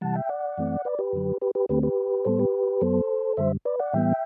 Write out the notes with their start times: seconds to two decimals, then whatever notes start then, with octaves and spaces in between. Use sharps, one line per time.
0.01 C3 E3 G3 F#5 A5
0.15 E5 G5
0.29 D5 F#5
0.57 F#2 E3 A3 C4
0.85 B4 D5
0.99 G4 B4
1.13 F#2 D3 F#3
1.41 G4 B4
1.55 G4 B4
1.69 D2 D3 A3 C4 G4 B4
1.83 G4 B4
2.25 A2 G3 B3 A4 C5
2.39 G4 B4
2.81 F#2 F#3 B3 A4 C5
3.37 F#2 D3 G3 C5 E5
3.65 B4 D5
3.80 D5 F#5
3.93 A2 E3 G3 B3 E5 G5